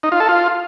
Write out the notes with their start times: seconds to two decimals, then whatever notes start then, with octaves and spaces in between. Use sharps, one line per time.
0.03 D#4
0.12 F4
0.20 A4
0.29 F4